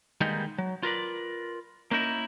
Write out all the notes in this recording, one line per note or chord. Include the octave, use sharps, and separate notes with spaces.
D#3 G3 G#3 A#3 B3 D#4
F#3
F4 A#4 B4 D5
A#3 C#4 D#4 E4 A#4